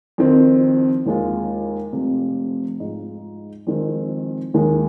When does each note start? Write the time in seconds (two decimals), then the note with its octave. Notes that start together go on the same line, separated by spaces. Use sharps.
0.18 F2 D#3 C4
1.06 D#2 D#3 G#3 F4
1.93 F1 F2 C3 F3
2.80 G#2 G#3 F4
3.67 F2 D#3 G#3 C4
4.54 D#2 D#3 G#3